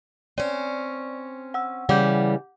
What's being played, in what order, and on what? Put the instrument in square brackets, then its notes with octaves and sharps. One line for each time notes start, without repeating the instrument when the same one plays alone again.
[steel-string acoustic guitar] C4 C#4 [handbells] D5
[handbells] F#5 E6
[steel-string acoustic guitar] C#3 E3 G3 [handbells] F#5 D6 G6